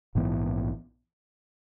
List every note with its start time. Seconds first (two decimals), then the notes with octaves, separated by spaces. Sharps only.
0.15 A#1 G#2 E3 B3